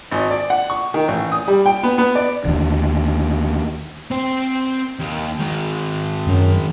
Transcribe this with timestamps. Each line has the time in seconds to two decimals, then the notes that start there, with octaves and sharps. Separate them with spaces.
0.12 G#1
0.31 D5
0.50 F#5
0.70 C#6
0.94 D#3
1.08 A1
1.32 D#6
1.48 G3
1.66 G5
1.83 B3
1.98 B3
2.15 D5
2.45 D#2 D3
4.11 C4 C5
4.99 D#2
5.39 D#3 G#3
6.27 F#2